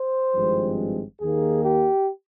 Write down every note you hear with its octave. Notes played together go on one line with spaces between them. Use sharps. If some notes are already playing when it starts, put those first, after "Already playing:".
Already playing: C5
G#1 G2 F3 G#3 C4
D#2 D#3 A#3 G#4
G4